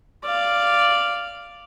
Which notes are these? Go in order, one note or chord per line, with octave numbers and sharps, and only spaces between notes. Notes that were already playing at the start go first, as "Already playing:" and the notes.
D5 F5